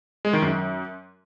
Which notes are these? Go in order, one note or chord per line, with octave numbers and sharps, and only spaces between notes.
G#3
D#3
F#2